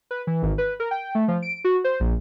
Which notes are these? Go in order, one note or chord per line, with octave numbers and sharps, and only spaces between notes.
B4
E3
G#1
B4
A#4
G5
A3
F3
D7
F#4
C5
A#1